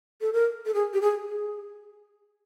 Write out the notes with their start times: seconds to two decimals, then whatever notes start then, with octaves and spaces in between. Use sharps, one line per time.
0.21 A4
0.33 A#4
0.66 A4
0.74 G#4
0.93 G4
1.02 G#4
1.28 G#4